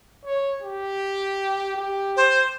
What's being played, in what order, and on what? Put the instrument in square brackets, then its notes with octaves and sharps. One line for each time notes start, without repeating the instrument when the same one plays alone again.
[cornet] C#5
G4
G4
[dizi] C5